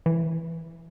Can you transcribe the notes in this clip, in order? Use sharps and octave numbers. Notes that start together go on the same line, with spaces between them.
E3